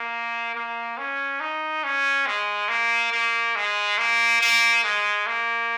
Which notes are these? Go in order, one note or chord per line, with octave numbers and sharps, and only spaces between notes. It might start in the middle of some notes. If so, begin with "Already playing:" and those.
Already playing: A#3
A#3
C#4
D#4
C#4
G#3
A#3
A#3
G#3
A#3
A#3
G#3
A#3